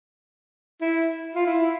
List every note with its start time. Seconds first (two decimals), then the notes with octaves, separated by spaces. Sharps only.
0.81 E4
1.35 F4
1.46 E4